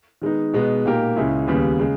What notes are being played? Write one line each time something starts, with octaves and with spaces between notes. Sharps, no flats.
D#3 G#3 B3 D#4
B2 G#3 B3 D#4
A#2 A#3 D#4 G4 A#4
C#2 C#3 G#3 C#4 E4
D#2 C#3 G3 B3
C#3 G#3